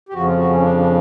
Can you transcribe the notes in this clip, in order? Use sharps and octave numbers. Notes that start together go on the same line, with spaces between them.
G4
F2 C#3 F3 F#4
F4
F#4
C#4
D4
D4